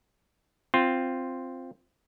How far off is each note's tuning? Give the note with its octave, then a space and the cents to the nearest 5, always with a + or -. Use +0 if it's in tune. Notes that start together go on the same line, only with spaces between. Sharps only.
C4 +0 F4 +0